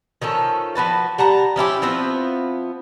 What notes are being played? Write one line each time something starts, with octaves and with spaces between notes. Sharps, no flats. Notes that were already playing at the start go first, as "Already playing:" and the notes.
D#3 F3 C#4 A4
F3 F#4 B4 A5
G3 F#5 A5 A#5
F3 C#4 E4 G4
F3 B3 C4 E4